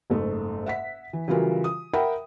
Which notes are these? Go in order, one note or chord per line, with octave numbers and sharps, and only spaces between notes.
F#1 G#2 A3
E5 F#5 B6
E3
C#3 E3 F#3 G3 F4 A#4
D#6
A#4 E5 F#5 G5 B5